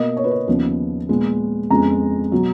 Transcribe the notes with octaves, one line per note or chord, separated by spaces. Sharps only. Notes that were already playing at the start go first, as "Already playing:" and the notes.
Already playing: B2 A#3 D#5
C#5
B4
C#5
D#2 C#3 F3 B3
A#2 G#3 B3
F2 C#3 G#3 B3 A#5
B2 F#3